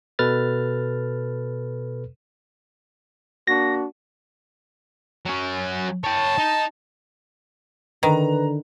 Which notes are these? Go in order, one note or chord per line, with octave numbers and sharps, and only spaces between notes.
B2 A4 B4 F6 A6
A#3 D4 F#4 A#6
F#3 C#4
C#5 G5 A5
D#4
D3 D#3 B4 A#5